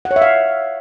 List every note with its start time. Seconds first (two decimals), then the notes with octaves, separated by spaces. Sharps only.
0.05 F#5
0.11 C#5
0.16 E5
0.22 F5